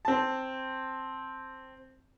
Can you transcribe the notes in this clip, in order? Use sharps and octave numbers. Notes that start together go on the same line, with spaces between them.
C4 A5